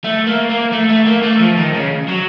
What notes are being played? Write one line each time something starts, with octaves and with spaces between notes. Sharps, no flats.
A3
A#3
A#3
A3
A3
A#3
A3
F3
D#3
C#3
F#3